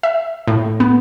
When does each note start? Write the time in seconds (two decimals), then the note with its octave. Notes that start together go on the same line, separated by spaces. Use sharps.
0.03 E5
0.47 A2
0.80 B3